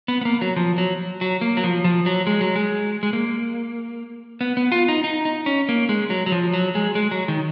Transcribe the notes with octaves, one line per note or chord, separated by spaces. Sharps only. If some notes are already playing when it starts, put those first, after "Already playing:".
B3
B3
A#3
F#3
F3
F#3
F#3
A#3
F#3
F3
F3
F#3
G#3
F#3
G#3
G#3
A#3
B3
B3
F4
D#4
D#4
D#4
C#4
A#3
G#3
F#3
F#3
F3
F#3
G#3
G#3
F#3
D#3